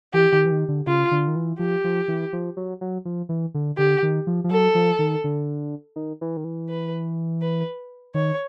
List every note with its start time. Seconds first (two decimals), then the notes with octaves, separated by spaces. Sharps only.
0.14 E3 G4
0.33 D#3
0.46 E3
0.51 D#3
0.69 D3
0.87 C#3 F4
1.11 D3
1.28 D#3
1.36 E3
1.59 F3 G4
1.84 F3
2.08 E3
2.33 F3
2.57 F#3
2.81 F#3
3.05 F3
3.29 E3
3.54 D3
3.78 D3 G4
4.03 D#3
4.27 F3
4.44 F3
4.51 F#3 A4
4.75 F3
4.99 D#3
5.24 D3
5.96 D#3
6.21 E3
6.37 D#3
6.44 E3
6.69 B4
7.41 B4
8.14 D#3 C#5